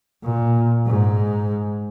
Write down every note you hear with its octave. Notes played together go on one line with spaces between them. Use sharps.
A#2
G#2